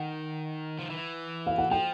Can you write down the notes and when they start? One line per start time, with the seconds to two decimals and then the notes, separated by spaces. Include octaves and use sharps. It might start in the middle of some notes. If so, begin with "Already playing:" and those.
Already playing: D#3 F#5
0.79 F3
0.90 E3
1.47 F5
1.58 F#5
1.71 F3 G5